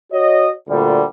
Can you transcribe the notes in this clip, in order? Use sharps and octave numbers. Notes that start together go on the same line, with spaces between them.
F#4 C#5 D#5
D2 A#2 D3 G3